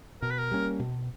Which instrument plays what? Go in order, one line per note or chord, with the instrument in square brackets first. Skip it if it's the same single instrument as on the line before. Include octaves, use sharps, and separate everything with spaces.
[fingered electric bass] B2 [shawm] A#4
[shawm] B4
A#4
[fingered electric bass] G3 A#3 C#4
B2